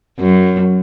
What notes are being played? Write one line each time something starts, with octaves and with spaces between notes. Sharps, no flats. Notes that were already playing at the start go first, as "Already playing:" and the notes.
F#2